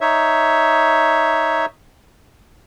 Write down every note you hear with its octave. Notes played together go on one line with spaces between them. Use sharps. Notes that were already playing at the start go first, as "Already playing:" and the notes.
D#4 C#5 E5